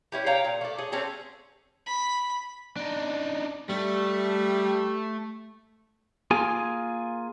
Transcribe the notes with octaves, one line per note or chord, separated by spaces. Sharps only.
C#4 E4 G4
C#5 F5 G5 A#5
A#2
A3 D5
G#4 C#5
A3 C4 C#4 G#4
B5
D4 D#4
G3 A3
A#3 F4 G#4 G#5